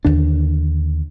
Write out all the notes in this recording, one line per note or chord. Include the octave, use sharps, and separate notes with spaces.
D#2 D3 D4